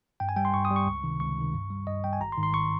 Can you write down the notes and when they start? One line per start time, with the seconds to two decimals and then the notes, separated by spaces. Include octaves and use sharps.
0.20 G2 G5
0.29 G#5
0.36 G3 G5
0.45 C6
0.53 G2 C#6
0.65 D#6
0.70 G3
0.76 C#6
0.87 C#2
1.04 C3 D#3
1.20 C#2 C#6
1.38 C3 D#3
1.54 G2
1.70 G3
1.87 G2 D#5
2.04 G3 G5
2.13 G#5
2.20 G#1 A#5
2.32 C6
2.37 G#2 D#3
2.43 C6
2.54 G#1 C#6